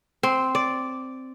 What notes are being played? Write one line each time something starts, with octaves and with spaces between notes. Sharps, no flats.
C4
D5